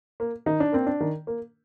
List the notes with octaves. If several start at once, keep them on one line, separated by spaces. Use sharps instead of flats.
A#3
D#3 D#4
D4
A#3 C4
D4
D#3
A#3